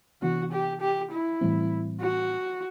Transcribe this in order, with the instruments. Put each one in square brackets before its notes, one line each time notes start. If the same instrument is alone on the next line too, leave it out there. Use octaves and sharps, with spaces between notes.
[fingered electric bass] C3 E3 B3 D4 [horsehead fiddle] F#4
[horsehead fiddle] G4
G4
E4
[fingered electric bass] A2 E3 G3 C4
[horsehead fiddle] F#4